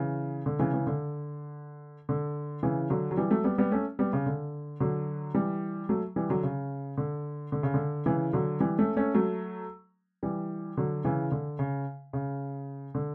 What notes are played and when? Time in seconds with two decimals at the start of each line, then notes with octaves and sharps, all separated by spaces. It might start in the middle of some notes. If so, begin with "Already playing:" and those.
Already playing: C#3 E3
0.46 D3
0.59 C#3 E3
0.73 C#3 E3
0.87 D3
2.09 D3
2.63 C#3 E3
2.90 D3 F#3
3.11 F#3
3.17 E3 G3
3.31 F#3 A3
3.44 G3 B3
3.58 G3 B3
3.72 A3 C#4
3.99 G3 B3
4.13 C#3
4.26 D3
4.80 D3 F#3
5.34 E3 G3
5.89 F#3 A3
6.16 E3 G3
6.30 D3 F#3
6.43 C#3
6.98 D3
7.52 D3
7.63 C#3
7.74 D3
8.06 C#3 E3
8.33 D3 F#3
8.60 E3 G3
8.78 A3 C#4
8.96 A3 C#4
9.14 F#3 A3
10.23 E3 G3
10.77 D3 F#3
11.05 C#3 E3
11.32 D3
11.59 C#3
12.13 C#3
12.95 D3